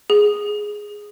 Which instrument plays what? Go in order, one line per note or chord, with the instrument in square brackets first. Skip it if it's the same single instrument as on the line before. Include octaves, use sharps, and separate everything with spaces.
[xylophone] G#4